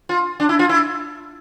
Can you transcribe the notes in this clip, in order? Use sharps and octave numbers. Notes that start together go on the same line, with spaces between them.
F4
D4
E4
F4
E4